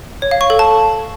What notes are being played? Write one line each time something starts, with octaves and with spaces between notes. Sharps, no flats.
C#5
F5
C#6
A4
A5